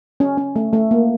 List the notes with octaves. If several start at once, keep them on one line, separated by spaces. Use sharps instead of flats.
C#4
C#4
A3
A3
A#3